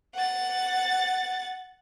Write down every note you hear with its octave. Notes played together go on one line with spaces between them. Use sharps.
F#5 A6